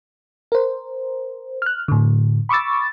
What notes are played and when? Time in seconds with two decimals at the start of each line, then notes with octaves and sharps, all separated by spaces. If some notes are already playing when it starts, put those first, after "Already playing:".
0.52 A#4 C5
1.62 F6 F#6
1.88 A2 D3
2.49 B5 C#6 D6 E6 A6